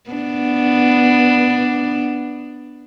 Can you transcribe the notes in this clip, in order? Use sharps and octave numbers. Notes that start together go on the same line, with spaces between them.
B3 D4